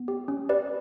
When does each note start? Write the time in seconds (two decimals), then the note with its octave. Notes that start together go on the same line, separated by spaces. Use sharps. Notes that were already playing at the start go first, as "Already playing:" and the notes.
Already playing: B3
0.08 G4
0.28 C#4
0.49 G4 B4 D5